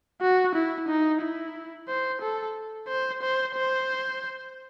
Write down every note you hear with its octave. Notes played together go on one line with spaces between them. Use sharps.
F#4
E4
D#4
E4
C5
A4
C5
C5
C5